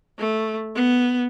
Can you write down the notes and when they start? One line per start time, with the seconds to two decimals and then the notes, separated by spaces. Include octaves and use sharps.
0.18 A3
0.75 B3